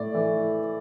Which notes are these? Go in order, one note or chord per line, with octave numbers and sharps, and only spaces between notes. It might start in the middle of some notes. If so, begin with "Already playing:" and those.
Already playing: A2 D5
E3 A3